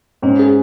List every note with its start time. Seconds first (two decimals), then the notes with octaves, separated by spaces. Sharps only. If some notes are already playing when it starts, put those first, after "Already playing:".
0.22 G#2 C#4
0.39 G#4